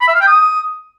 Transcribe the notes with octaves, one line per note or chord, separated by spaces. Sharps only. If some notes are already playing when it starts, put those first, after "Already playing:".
B5
E5
F5
G5
D#6